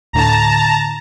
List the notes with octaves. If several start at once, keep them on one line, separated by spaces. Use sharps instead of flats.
D2 A2 D3 A5 A#5